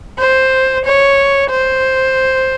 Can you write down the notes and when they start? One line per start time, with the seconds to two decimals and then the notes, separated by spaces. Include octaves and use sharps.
0.19 C5
0.85 C#5
1.50 C5